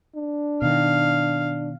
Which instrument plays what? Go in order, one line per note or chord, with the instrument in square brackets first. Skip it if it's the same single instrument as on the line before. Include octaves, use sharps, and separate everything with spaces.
[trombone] D4
[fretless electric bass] B2 D#3 [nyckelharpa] F5